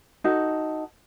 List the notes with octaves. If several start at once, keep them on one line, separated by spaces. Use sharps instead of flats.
D#4 F#4 A4